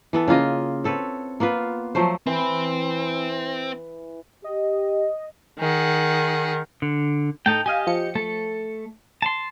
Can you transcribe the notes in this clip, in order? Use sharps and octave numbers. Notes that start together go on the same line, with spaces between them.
E3 B3 A4
C#3 A#3 F4 D#5
C4 A4 B4 C#5
A#3 B3 F4 B4
F3 F#3 A3 C5
E3 C4
G4 D#5
D#3 G#4 F#5
D3
A2 D#4 A4 G5
G4 D#5 F5 G#5
F3 C#7
A3 A4
A5 C6